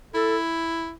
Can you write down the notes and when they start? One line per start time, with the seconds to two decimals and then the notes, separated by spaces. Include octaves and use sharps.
0.14 E4 A4